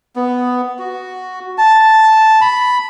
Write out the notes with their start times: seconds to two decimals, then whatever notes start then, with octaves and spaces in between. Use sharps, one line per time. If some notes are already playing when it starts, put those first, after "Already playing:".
0.16 B3
0.79 F#4
1.58 A5
2.41 B5